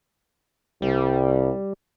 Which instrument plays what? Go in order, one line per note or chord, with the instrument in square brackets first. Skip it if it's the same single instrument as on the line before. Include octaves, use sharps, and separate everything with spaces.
[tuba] C2 [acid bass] G3